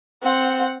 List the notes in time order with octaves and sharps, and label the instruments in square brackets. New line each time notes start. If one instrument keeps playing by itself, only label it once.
[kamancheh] C4 F#5